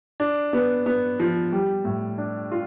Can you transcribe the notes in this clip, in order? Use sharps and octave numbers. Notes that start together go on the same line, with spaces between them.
D4
B3
B3
F3
G3
A2
D4
F4